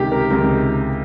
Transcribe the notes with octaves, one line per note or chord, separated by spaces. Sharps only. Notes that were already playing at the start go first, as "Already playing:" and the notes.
Already playing: C#2 C3 D#3 G4
A#4
C#2 C3 D#3 A#4